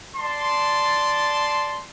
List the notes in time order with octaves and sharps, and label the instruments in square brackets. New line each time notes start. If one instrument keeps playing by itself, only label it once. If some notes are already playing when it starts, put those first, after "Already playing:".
[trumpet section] D5 A5 C6